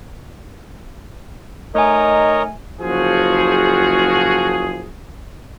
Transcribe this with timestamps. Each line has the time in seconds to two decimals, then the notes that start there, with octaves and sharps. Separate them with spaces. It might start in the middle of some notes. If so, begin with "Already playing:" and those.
1.75 A3 D#4 A#4 C#5 D#5 G#5
2.81 F#1 F3 F#4 G#4